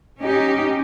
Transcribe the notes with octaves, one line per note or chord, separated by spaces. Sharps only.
C#4 D#4 G4